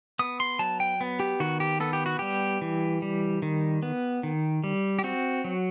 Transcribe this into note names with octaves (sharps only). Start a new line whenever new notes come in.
B3 D#6
C6
F#3 A5
G5
B3
G4
D#3 F#4
G4
B3 A4
G4
F#4
G3 G4
E3
G3
D#3
B3
D#3
G3
G4
C4 F#4
F#3